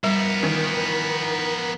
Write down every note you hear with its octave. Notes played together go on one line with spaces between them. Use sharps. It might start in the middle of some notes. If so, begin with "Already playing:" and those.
F3 G3 B3 A#4 E5
D#3 E3